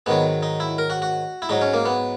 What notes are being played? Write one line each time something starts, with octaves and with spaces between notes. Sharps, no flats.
G#2 D#3 F#3 B3
D#4
E4
A#4
F#4
F#4
E4
G#2 F#3 D#4
C#4
A#3
B3